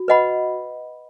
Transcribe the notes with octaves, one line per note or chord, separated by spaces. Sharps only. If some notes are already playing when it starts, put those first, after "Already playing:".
Already playing: F#4
B4 D#5 F#5 B5